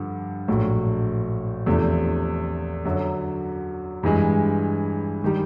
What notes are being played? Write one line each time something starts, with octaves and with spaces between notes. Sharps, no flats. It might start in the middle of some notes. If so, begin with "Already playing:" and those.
Already playing: G2 D3 F3
A#1 A2 F#3
E2 C3 F3 A3 D4
F#2 D3 F#3
G2 E3 G#3
D#3 G3